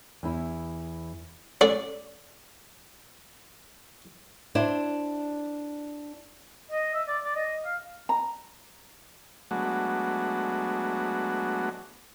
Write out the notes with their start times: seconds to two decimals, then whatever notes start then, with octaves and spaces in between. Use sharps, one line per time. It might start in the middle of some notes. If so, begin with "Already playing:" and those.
0.23 E2 E4
1.61 C#4 F#4 A4 D5
4.55 D4 E4 C5 D5
6.71 D#5
6.94 E5
7.08 D5
7.24 D5
7.36 D#5
7.65 F5
8.09 A#5
9.51 F#3 G#3 A3 B3 D4 F#4